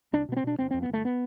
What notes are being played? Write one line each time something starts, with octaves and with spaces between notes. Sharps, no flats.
C2 D4
B2 B3
C4
B2 D4
G1 C4
C4
F2
B3
G1 A3
B3